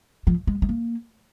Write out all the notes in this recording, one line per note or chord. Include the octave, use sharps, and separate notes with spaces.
F3
G#3
G#3
A#3